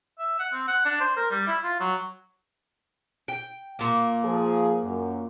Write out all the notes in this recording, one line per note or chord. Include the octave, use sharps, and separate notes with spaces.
E5
F#5
C4
F#5
D4
C5
A#4
G3
E4
F4
F#3
G5
A#2 A#3
F3 G#4
F#2